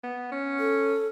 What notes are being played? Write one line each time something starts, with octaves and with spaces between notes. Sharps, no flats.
B3
C#4
A4